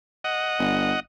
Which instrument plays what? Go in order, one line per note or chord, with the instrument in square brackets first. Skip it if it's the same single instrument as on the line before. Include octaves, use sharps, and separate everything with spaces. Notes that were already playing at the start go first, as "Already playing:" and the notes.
[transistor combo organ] D#5 F#5
[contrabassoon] G1